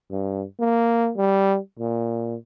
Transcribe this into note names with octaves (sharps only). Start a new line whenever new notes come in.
G2
A#3
G3
A#2